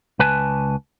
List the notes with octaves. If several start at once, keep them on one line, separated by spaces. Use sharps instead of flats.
C#2 B4 G#5 A5